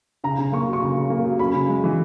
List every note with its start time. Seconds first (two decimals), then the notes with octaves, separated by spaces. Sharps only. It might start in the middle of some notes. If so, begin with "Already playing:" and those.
0.24 C#3 A#5
0.38 C#3
0.52 A#3 C#6
0.68 F#3
0.73 C#6
0.82 C#3
0.96 C#3
1.10 A#3
1.25 F#3
1.39 C#4 B5
1.54 C#3
1.69 G#3
1.84 E3